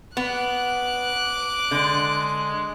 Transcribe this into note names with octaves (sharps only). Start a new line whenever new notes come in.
B3 D6 F#6
D3 G#3